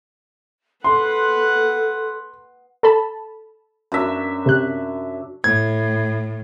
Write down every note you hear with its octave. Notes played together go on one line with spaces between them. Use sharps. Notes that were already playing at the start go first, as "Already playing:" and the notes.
A4 B4 F#5 C6
A4 A5 B5
F#2 D4 E5
C3 F#6
A2 G#6